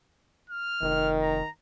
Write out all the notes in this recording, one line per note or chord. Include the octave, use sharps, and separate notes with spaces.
F6
F1 D#3
A#5